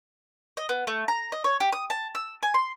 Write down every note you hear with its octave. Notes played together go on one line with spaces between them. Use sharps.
D#5
B3
A3
A#5
D#5
C#5
G4
D#6
A5
E6
G#5
C6